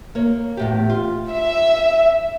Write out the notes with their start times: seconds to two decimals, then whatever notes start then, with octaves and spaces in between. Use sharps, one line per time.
0.15 A#3 C#5
0.57 E2 A2 G4
0.90 F4
1.30 E5